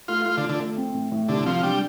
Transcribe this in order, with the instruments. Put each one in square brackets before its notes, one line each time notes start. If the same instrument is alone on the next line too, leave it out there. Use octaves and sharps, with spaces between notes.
[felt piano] A3 [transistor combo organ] F4
[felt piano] A3 [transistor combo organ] F4
[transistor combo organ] D3
[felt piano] F4
[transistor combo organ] D3
[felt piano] A3
C4
A2
A2
[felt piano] C2 [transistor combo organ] D3
[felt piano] C3 [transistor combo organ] F3
[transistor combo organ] G3 [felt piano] D4